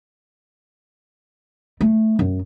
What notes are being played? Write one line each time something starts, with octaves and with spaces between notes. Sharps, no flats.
A3
F#2